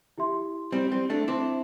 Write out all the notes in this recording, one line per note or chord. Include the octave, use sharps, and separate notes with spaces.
E4 G4 E5 C6
G3 C4
G3 C4
A3 D4
C4 D4 E4 C5 A5 D6